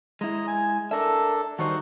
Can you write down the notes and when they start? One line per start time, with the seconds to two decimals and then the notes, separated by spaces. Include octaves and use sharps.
0.21 G#3 E4 D#5 A#5
0.47 G#5
0.91 D4 A4 A#4 E5
1.59 D#3 G3 D#4 F#4 C5 F#5